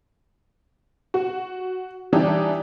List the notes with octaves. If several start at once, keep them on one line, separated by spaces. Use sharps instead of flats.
F#4
E3 G3 D4 D#4 G4